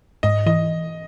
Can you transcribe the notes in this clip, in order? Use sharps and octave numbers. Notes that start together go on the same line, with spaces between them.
G#2 D#5
E3 D#5